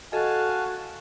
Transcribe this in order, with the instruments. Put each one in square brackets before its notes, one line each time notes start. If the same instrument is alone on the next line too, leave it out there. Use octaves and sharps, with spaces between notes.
[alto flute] F#4 [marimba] A4 D#5 [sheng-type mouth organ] F5 G#5 A5